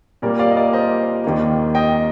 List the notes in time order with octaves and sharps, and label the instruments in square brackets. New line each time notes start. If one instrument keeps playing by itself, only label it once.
[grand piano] A#2 G3 A#3 A#4 D5
D5 F5
D#5
A#4 D5
C5 D#5
D#2 D#3 A#3
D#5 G5